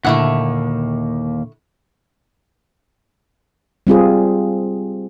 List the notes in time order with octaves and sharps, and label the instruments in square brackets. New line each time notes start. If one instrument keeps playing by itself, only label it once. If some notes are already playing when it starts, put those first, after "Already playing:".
[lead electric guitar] D#2 A#3 [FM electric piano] A#2 D3 [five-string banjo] A3 E4 F#5
[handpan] G3 C4 F4 G#4